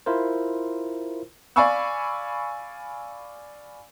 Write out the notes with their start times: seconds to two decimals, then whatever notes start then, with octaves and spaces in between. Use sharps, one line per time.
0.06 E4 F4 A#4 C5
1.56 D5 F5 G#5 B5 C#6 E6